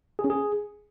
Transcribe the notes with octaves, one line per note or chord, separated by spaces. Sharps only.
G#4
C#4
G#4